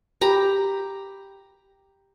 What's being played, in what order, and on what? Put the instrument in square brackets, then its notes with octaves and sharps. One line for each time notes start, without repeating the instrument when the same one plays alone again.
[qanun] G4 A#5 B5